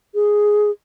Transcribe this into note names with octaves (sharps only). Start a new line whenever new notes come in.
G#4